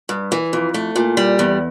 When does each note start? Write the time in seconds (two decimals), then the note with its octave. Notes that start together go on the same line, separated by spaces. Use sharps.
0.09 G2
0.32 E3
0.53 F2
0.74 A3
0.96 A#2
1.17 G3
1.39 E2